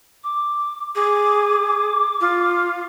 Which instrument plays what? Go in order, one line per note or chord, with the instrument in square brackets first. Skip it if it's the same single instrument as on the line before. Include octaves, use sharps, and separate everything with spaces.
[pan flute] D6
[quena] G#4 [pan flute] D6
[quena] F4